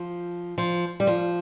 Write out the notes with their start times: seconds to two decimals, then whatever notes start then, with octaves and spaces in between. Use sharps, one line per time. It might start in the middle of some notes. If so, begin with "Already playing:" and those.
Already playing: F3
0.58 F3
1.00 G3
1.07 F3